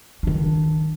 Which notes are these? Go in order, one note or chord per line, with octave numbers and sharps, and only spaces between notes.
D#3 D4